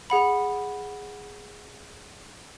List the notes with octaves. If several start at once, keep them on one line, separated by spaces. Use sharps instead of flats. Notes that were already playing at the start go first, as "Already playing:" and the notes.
G#4 F#5 B5